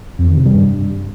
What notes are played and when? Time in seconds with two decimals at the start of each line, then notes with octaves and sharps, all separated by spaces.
0.19 F2
0.28 D#3
0.37 C3
0.46 G3
0.55 G2